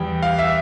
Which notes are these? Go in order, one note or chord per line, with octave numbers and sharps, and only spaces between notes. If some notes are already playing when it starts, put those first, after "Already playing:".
Already playing: E2 E3 G3 G5
F5
E5